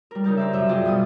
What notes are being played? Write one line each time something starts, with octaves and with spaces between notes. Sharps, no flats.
G3 A#4
C#3 D#4 G4 A#4
C5 D5 E5
F#2 C3 E5
C4 F4 G#4 D5 D#5 G5
B2 G3 B3 D#6